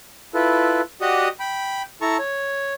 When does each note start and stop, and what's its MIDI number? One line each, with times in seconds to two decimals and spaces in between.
0.34 0.81 64
0.34 0.81 65
0.34 0.81 69
0.34 0.81 71
1.01 1.29 66
1.01 1.29 67
1.01 1.29 74
1.01 1.29 75
1.01 1.29 78
1.01 1.29 87
1.40 1.82 79
1.40 1.82 83
2.02 2.17 64
2.02 2.17 69
2.02 2.17 81
2.02 2.17 82
2.02 2.17 85
2.19 2.74 73